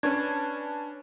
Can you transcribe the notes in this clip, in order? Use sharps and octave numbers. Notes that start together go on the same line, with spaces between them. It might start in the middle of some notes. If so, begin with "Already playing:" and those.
C#4 D4 B4 C#6 G#6